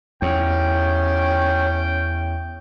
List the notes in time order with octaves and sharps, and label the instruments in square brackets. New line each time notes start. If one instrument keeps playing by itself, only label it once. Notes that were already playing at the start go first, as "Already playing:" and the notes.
[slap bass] E2 [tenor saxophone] C#4 [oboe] G5